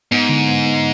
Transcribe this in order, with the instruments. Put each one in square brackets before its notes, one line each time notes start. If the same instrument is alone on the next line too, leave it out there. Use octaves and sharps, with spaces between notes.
[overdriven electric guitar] G#2 [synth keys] B3
[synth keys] D3
B3
B3